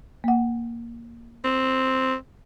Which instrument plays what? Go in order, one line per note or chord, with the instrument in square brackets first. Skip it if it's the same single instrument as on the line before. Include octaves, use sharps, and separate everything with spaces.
[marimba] A#3 F#5
[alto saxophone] C4